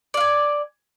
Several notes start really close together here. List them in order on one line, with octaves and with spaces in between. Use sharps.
D5 F5 G#5